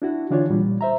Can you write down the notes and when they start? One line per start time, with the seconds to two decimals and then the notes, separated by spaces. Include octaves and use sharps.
0.02 D4 E4 F#4
0.31 D3 E3 D4 F4 F#4 C#5
0.50 A#2 G3
0.81 C5 E5 A#5